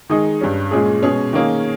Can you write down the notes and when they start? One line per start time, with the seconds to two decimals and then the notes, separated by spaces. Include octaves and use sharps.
0.09 D#3 G#3 D#4 G#4
0.41 G2 G3 C#4
0.71 A#2 G#3 C#4 G#4
1.02 B2 G#3 C#4 G#4
1.33 D#3 A#3 C#4 G#4